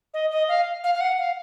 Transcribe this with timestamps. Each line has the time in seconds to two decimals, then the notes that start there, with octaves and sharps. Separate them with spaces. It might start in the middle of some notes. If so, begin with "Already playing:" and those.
0.14 D#5
0.31 D#5
0.48 F5
0.84 F5
0.95 F5
1.01 F#5
1.19 F5